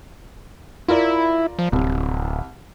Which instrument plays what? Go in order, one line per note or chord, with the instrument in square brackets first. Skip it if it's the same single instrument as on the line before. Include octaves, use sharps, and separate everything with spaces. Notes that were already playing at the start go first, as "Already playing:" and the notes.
[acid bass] E4 [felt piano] F4 A#4 D5
[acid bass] F3
[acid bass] D1 [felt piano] C2